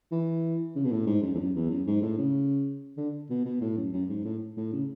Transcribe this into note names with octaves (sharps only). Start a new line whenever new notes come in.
E3
C#3
B2
A2
G#2
F#2
E2
F#2
E2
F#2
G#2
A2
C#3
D3
B2
B2
A2
F#2
F#2
G#2
A2
A2
C#3